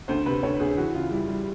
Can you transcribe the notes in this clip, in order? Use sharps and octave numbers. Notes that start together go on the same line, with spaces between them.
D2 C5
C3 B4
D2 C#5
D2 G#4
E3 F#4
C#3 F4
G3 E4
G3